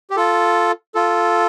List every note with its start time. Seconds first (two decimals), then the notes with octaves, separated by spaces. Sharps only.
0.11 G4
0.16 F4 A4
0.95 F4 A4